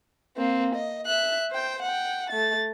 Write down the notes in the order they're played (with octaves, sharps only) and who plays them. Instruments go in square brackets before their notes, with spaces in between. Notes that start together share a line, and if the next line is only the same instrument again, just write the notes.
[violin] A#3 C4
D#5
E5 F#6
C5 G5
F#5 G5
A3 A6